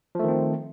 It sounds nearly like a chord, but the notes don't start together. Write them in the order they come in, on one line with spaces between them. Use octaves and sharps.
F3 A3 D#3 C4